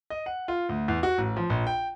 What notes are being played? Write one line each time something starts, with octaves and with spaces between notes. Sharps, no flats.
D#5
F#5
F4
D2
E2
F#4
A1
F3
A#1
G5